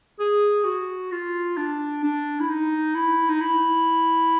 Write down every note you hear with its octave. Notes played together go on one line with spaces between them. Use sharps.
G#4
F#4
F4
D4
D4
E4
D#4
E4
D#4
E4